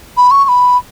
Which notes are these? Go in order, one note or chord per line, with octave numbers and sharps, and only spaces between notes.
B5
C#6
C#6
B5